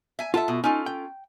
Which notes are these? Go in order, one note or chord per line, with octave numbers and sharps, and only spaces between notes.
E5 G#5
F4 A4 E5 F#5 A5
B2
C#4 D#4 F4 A4
G5